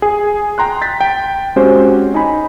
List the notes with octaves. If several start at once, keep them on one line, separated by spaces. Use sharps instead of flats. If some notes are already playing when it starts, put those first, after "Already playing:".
G#4
G5 A#5 C6 F#6
G6 A6 B6
G5
G#3 C4 C#4 F#4 G4 C5
D#4 G#5 B5